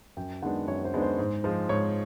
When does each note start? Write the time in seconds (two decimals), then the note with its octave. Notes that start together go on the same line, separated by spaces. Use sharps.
0.17 F#2 G5
0.42 D#3 G#3 B3 D4 F#5
0.68 F#2 C#5
0.85 C5
0.93 D#3 G#3 B3 D4
1.02 C5
1.19 G#2
1.44 F3 G#3
1.69 G#2 C#5